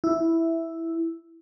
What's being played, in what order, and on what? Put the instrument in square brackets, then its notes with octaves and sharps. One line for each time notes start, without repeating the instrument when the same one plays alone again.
[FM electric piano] E4